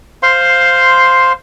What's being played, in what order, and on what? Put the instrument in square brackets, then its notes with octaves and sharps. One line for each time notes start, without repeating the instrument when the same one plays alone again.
[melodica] C5 F5 C6